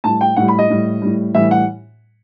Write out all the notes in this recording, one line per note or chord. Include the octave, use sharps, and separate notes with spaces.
A2 G3 A5
G5
A2 G3 F#5
B5
D#5
A2 G3
A2 G3
A2 E3 G3 E5
F#5